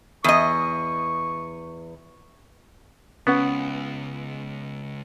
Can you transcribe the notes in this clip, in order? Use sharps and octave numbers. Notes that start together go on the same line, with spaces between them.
E2 D#5 C#6
C#2 B3 C#4 B4 F#5